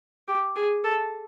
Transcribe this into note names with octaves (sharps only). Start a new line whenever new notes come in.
G4
G#4
A4